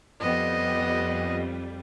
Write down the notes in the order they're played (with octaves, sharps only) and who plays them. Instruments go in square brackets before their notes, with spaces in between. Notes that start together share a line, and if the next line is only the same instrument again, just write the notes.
[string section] F2 G3 [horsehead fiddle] B3 D#5